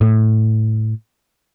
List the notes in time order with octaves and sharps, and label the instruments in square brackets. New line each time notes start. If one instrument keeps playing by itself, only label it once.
[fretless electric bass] A2